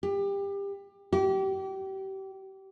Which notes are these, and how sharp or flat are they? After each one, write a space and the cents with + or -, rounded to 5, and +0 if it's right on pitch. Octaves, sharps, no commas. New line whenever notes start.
G4 +25
G4 -30